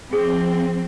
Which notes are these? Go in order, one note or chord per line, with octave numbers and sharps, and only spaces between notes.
F3 C4 G#4